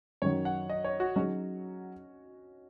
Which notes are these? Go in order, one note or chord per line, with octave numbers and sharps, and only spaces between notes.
F#2 D#3 F#3 C#5
F#5
D#5
C#5
F#4
F#3 C#4 D#4 G#4